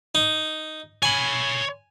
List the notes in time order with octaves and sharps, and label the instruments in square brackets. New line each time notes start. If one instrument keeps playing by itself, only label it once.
[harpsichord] D#4
[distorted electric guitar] C#5 B5 [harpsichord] G#5